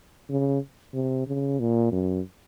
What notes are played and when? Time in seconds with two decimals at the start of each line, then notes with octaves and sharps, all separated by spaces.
0.29 C#3
0.94 C3
1.27 C#3
1.60 A#2
1.92 F#2